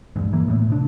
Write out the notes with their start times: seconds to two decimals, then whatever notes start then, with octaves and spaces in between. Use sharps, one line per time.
0.16 A#1 E2 G2 G#3
0.33 E3 A#3
0.48 A2 A3 B3
0.70 C3 D4